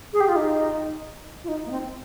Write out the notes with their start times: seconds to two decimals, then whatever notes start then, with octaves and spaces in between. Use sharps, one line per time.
0.13 G#4
0.20 G4
0.28 F4
0.36 D#4
1.44 F4
1.48 D#4
1.66 A#3
1.71 C4